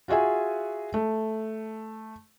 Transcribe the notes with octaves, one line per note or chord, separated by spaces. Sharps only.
F4 F#4 G#4 E5 G#5
A3